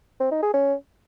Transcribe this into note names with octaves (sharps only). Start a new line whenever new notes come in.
C4
D#4
G#4
C#4